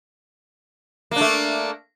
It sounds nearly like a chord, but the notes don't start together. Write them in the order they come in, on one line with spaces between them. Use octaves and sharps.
A#3 D4 A3